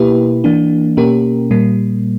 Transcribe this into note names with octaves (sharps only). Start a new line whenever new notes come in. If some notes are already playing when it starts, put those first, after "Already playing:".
Already playing: B2 A#3 E4 G4 B4
E3 A#3 D4
B2 A#3 C#4 G4 A#4
A#2 G3 A#3